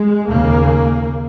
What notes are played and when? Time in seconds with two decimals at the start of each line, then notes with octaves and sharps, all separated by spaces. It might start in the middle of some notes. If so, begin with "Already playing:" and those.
Already playing: G#3
0.28 D#2 C#3 A#3